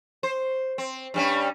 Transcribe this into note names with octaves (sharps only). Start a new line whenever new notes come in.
C5
C4
G2 G3 C#4